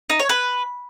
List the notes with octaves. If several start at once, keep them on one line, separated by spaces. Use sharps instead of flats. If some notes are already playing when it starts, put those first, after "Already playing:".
D#4
C#5
B4